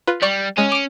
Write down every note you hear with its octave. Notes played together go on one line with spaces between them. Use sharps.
F4 B4
G3 D5 C#6
G#3 C#4
D6 D7